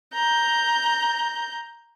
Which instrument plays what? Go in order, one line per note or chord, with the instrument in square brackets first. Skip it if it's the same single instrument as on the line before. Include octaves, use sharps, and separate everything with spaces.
[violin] A#5 G6